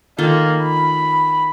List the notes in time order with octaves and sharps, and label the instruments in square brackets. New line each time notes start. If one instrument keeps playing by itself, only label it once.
[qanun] D#3 F4 A4 [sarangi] A#3
[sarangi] B5